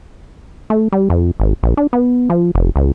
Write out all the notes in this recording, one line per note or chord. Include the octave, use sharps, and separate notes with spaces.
A3
G3
F2
G#1
A#1
D4
B3
F3
F1
C#2